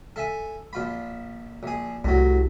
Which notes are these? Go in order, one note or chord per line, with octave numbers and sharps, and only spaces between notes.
A4 E5 G#5
A#1 F4 B5
A#1 G#4
C2 A2 F#3